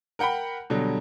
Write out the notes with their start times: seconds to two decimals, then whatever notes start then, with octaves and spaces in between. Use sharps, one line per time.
0.19 A#4 F#5 G5 A#5 B5
0.70 B2 D3 F#3 G3